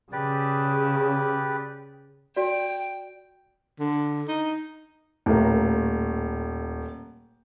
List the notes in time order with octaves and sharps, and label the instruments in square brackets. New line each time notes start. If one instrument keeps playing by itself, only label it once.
[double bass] C#3 [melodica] G4 B4 D5
[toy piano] F#4 D5 [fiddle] G5
[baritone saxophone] D3
D#4
[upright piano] D#1 [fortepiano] A2 A#3